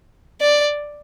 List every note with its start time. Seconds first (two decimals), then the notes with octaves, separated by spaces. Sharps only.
0.41 D5